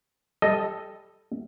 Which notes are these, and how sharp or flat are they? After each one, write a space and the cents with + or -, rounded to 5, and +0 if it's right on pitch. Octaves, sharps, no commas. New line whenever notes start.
G3 +20 A4 +0 D#5 +0